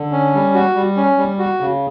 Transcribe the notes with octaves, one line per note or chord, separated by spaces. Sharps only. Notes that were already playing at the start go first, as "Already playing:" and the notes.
Already playing: D3
C#4
G3
F#4
G3
C#4
G3
F#4
C#3